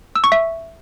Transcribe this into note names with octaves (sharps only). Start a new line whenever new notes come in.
E6
C#6
E5